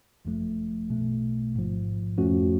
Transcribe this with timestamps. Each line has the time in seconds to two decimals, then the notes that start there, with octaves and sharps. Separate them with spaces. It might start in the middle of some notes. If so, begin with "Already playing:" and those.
0.25 G#1 F#2 F3 A3
0.88 B1 B2 A3
1.54 A1 G#2 F3
2.18 F2 F3 A3 C#4 F#4